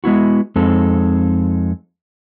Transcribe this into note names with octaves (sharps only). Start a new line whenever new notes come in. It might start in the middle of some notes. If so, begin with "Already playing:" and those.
G#3 B3 E4 F#4
F2 G#3 C4 D#4 A4